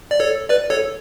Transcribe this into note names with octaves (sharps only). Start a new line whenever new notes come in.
D5
A4 C#5
B4 D5
A4 C#5